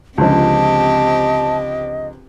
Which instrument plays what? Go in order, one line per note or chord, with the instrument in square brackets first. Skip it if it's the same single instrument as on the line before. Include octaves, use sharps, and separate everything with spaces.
[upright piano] C#2 D3 F3 [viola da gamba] C4 G4 [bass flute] D#5 [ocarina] A5